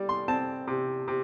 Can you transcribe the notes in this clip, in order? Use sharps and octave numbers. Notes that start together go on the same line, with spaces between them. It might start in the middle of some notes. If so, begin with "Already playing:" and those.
Already playing: G3 D5
C6
C4 A5
C3
C3